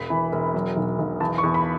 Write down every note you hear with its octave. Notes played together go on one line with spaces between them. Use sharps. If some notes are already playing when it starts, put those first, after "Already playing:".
Already playing: E1 B5
E3
E1
F#3
B1
B1
E2 A5
C#6
E2
B5